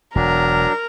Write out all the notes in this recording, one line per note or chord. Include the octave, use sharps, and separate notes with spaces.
E1 F#3 D4 A#4